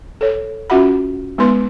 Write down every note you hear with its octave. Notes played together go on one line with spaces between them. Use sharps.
A4 C#5
C#4 F4 F#4 E5 F#5 B5
G#3 B3 D#4 B4 C6